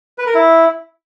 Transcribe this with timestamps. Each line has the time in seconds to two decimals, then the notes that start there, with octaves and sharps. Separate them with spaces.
0.18 B4
0.26 A#4
0.35 E4